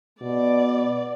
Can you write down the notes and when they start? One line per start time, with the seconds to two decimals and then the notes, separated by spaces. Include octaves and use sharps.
0.22 B2 D5